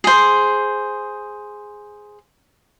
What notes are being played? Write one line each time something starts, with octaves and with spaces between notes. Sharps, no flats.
G#4 C5